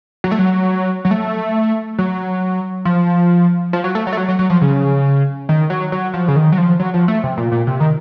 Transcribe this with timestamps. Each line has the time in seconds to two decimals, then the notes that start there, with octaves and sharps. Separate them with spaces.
0.24 F#3
0.32 A3
0.39 F#3
1.05 F#3
1.11 A3
1.98 F#3
2.85 F3
3.73 F3
3.84 F#3
3.95 A3
4.07 F#3
4.13 A3
4.17 F#3
4.28 F#3
4.39 F#3
4.50 F3
4.61 C#3
5.49 D#3
5.70 F#3
5.92 F#3
6.13 F3
6.28 C#3
6.36 D#3
6.52 F#3
6.58 F3
6.80 F#3
6.94 F3
7.08 A3
7.23 C3
7.37 A#2
7.52 A#2
7.67 C3
7.80 D#3